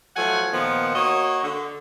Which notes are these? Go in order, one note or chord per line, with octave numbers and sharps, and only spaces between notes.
F3 F#3 A3 F#5 G#5
A#2 D#3 F3 B3
A#3 F#4 C#5 D#5
D3